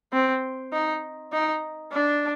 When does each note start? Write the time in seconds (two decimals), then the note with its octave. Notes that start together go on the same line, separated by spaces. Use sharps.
0.13 C4
0.72 D#4
1.32 D#4
1.92 D4